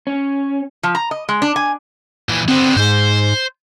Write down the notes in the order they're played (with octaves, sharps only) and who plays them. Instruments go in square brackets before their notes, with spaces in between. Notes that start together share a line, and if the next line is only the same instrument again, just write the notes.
[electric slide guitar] C#4
[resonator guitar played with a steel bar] F3
A#5
D#5
G#3
D4
G#5
[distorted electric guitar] A#2 E3
[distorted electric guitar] D3 B3 [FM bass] C4
[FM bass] G#2 [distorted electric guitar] C5